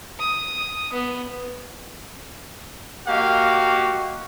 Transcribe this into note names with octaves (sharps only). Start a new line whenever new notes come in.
D#6
B3
A#3 F#4 G4 D#5 F5